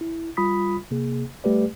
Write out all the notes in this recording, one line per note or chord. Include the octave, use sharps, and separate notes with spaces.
E4
G3 F4 B5 D#6 B6
C3 A#3 G#4
G3 A3 G4 B4 D5